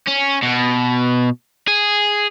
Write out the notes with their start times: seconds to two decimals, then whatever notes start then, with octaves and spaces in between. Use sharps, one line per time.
0.08 C#4
0.42 B2
1.67 G#4